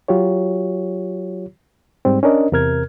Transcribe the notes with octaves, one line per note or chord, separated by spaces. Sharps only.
F#3 F4 G4 C#5
G#2 G3 C4
C#4 D4 A#4 D#5
E2 C3 A#4 F6 G#6